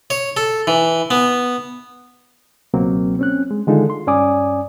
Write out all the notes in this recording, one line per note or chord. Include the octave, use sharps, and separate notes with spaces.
C#5
A4
E3
B3
C#2 B2 F#3 A#3 C4
C4 C#4 F#6
G#3
D3 D#3 G#3 D#4 F4 A4
C6
G2 C#4 D5 G#5 D6 D#6